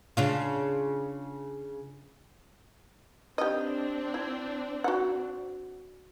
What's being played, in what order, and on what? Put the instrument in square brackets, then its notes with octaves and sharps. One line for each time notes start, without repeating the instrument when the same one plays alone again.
[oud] C#3 D4 F4
[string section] C4 D4 [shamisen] G4 D#5
[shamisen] E4
F#4 F#5